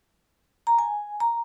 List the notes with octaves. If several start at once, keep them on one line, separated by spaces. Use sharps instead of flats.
A#5
G#5
A#5